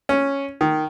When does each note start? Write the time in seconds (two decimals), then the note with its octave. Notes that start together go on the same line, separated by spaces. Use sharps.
0.09 C#4
0.61 D#3